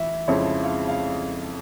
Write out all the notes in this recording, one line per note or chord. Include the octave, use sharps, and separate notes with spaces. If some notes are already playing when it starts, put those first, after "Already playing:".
Already playing: E3 E5
F2 C#3 F3 G#3 E4 C#5
F5
F5